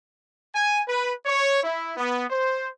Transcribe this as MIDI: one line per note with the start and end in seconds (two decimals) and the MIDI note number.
0.55 0.81 80
0.87 1.13 71
1.26 1.60 73
1.63 1.93 64
1.97 2.25 59
2.30 2.68 72